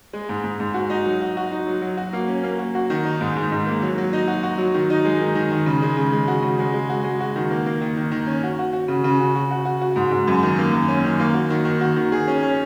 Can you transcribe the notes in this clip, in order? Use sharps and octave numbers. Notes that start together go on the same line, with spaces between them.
G#3
G#2
G#2
G#2
F#4
D#4
F#3
F#4
F#4
D#4
F#3
F#3
F#4
A#3
C#4
A#3
F#4
F#4
D#3
D#4
G#2
G#2
G#2
A#3
F#3
F#3
D#4
F#4
F#4
F#3
D#3
D#4
G#3
D#3
D#3
D#3
C#3
G#3
C#3
G#3
F#4
C#3
G#3
G#3
F#4
G#3
F#4
D#3
A#3
A#3
D#3
D#3
D#3
C#4
F#4
F#4
F#4
C#3
C#3
F#4
F#4
F#4
F#4
F#4
G#2
G#2
F#2
D#3
A#3
F#2
C#4
D#3
A#3
F#4
D#3
D#3
F#4
D#3
G#4
C#4
C#4